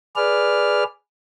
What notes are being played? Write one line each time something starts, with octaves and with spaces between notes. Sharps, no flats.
G#4 B4 D5 F6